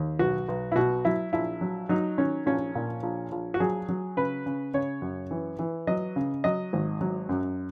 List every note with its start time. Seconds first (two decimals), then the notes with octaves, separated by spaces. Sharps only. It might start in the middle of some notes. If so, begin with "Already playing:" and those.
Already playing: D#2
0.19 B1 F#4
0.48 B1
0.72 E4
0.76 B2 F#4
1.05 F#3 E4
1.33 A#1 E4
1.61 F#3
1.89 F#3 D#4
2.18 D#3 C#4
2.46 A#1 C#4
2.75 A#2
3.03 A#1
3.32 A#1
3.54 F#4
3.60 F#3 G#4
3.89 F#3
4.17 C#3 B4
4.46 C#3
4.74 C#3 C#5
5.02 F#2
5.31 E3
5.59 E3
5.87 F#3 D#5
6.16 C#3
6.44 F#3 D#5
6.73 G#1
7.01 F#3
7.29 F#2